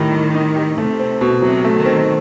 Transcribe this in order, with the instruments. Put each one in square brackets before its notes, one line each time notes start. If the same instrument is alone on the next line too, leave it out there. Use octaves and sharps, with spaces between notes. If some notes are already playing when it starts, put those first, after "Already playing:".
Already playing: [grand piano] A2 D#4 G4 [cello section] D#3
[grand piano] G3
D#4
G4
[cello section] C3 [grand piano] A3
[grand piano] C4
B2
[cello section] C3 [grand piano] F#3
[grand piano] A3
[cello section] D#3
[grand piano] C4